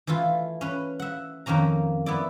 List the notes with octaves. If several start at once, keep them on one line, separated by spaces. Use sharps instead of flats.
E3 A3 E4 F4
C#4 B4
E5 F#5
F2 D#3 A#3 C#4 A#5
B3 E4 D5